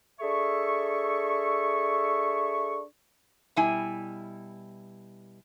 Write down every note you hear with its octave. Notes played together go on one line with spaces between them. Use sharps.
D4 G#4 A4 E5 C#6
B2 G3 E4 G#5